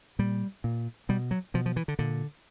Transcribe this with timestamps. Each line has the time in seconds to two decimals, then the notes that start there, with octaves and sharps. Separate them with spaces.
0.19 A#2 G3
0.64 A#2
1.09 B2 G3
1.31 F#3
1.54 B2 F3
1.66 F3
1.76 E3
1.88 D3
1.99 A#2 D3